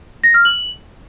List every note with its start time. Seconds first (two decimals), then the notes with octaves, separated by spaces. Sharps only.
0.24 A#6
0.34 F6
0.45 F#7